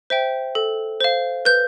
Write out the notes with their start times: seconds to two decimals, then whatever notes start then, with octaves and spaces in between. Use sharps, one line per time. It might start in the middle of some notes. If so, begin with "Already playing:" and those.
0.10 C5 E5 G5
0.55 A4
1.01 C5 F5
1.45 B4 G6